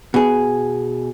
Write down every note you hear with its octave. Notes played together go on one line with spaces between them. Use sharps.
B2 G#4